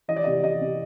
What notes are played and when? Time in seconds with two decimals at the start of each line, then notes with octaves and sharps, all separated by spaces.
0.08 E3 D#5
0.17 D5
0.24 C3 D#5
0.44 C3 D#5
0.61 C3